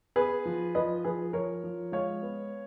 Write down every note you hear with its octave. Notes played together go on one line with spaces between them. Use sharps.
B3 G#4 B4
F3
F3 B4 D#5
F3 G#4 B4
F3 A#4 C#5
F3
G#3 C#5 F5
B3